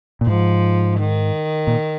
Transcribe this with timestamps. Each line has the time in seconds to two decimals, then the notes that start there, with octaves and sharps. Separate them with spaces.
0.21 A#2
0.27 G#2 F3
1.00 D#3
1.67 A#2